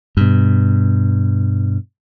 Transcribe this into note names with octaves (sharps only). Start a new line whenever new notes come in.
G2 B2